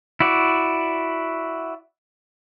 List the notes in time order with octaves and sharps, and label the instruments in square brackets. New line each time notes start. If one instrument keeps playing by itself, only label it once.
[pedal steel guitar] E4 F#4 D5